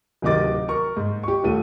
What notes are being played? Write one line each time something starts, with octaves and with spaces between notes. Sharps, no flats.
D1 C3 D#3 D#5 D6 A6
A#4 C#6
G#2
G4 C#6
D#1 A3 D#7